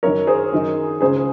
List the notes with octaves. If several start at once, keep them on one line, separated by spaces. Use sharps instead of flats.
F#2 D#3 A#4 C#5
G#4 C5
F#2 D#3
C#2 C#3 G#4 C5